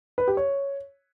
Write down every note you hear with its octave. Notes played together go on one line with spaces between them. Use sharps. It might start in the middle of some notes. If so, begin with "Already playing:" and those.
B4
G4
C#5